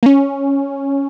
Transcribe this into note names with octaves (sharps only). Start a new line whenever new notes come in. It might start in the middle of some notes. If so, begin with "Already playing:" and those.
A#3
C#4